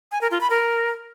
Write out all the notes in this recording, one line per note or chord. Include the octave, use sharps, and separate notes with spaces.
G#5
A#4
F4
B5
A#4